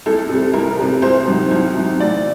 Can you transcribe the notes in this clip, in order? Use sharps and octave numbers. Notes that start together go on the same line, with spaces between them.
C2 A4
C3 G3
C2 A#4
C3 G3
C2 C5
C3 D#3 F#3
C2
C3 D#3 F#3
A1 D5